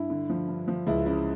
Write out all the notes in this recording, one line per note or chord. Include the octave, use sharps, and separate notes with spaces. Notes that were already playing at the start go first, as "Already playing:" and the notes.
Already playing: G2 E4
D3
F3
G2
F3
C#2 E4
C#3 E4